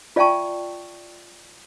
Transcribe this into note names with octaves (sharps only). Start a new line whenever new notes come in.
F4 D5 E5 G5 A5 C#6